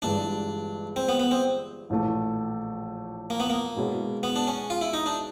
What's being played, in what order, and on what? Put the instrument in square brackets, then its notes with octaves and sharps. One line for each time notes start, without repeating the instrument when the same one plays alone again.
[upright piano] G1 G2 E3 G#3 [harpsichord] D4
[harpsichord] C4
B3
B3
C4
[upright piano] A#1 A2 E3 A3
[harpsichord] A#3
B3
A#3
[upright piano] B2 G#3 C#4 E4
[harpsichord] B3
D4
C#4
F4
E4
D#4
D4